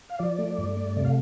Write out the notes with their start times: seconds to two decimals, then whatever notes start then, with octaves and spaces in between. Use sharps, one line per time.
0.09 F5
0.19 F3 D5
0.38 A3
0.58 G2
0.77 A3
0.97 C3 D5
1.04 F5